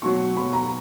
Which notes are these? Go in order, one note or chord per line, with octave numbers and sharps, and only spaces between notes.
B2 F#3 C#6
B2 F#3 B5
A#5